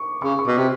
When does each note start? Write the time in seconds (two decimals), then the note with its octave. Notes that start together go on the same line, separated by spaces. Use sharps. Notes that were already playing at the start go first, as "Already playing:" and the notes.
Already playing: C#6 D6
0.22 C#3 C#6
0.39 C#6
0.46 B2 D6
0.58 C3